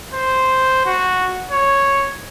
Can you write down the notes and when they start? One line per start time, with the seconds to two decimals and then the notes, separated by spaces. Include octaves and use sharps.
0.14 C5
0.86 F#4
1.51 C#5